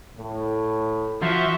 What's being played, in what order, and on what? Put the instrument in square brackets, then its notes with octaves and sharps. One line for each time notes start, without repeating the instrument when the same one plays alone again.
[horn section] A2
[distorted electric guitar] F3 [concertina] F#4 C6 C#6 [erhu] E5